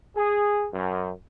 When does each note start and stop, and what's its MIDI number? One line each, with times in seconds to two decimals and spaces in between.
0.14 0.66 68
0.72 1.09 42